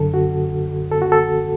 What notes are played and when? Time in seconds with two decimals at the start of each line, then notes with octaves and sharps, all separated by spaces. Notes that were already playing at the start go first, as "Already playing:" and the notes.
Already playing: F#2 D3 A4
0.14 F#4
0.91 A4
1.02 F#4
1.12 A4